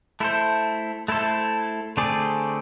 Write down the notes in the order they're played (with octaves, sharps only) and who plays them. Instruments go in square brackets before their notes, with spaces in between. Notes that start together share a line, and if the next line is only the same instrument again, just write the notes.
[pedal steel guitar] A3 E4 A4 C5
A3 E4 A4 C5
D3 A3 C4 G#4 D5